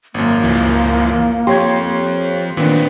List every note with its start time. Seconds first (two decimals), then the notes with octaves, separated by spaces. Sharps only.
0.14 G#1 F#2 A#3
0.44 C#2 E3 F3
1.47 F2 F3 G4 C#5 C6 G#6
2.57 A#2 D#3 B3 C4 D4